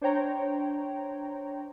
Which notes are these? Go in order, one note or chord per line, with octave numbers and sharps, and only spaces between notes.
D4 C5 C#5 G5 A#5